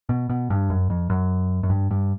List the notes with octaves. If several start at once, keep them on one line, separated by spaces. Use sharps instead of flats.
B2
B2
G2
F#2
F2
F#2
F#2
G2
G2